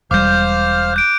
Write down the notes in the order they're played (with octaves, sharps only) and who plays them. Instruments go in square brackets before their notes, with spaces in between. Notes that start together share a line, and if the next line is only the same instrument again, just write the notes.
[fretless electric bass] E1 G3 [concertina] C5 F5 F6 [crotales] D6 G6
[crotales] F#6 G6 D7